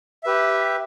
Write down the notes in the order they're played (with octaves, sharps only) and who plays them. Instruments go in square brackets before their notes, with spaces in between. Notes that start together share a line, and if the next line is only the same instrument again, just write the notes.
[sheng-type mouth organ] G4 B4 E5